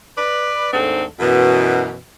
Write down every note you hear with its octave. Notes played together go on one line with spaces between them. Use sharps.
B4 D5
D#2 G#2 A3 C4 D4 A4
F#2 B2 E3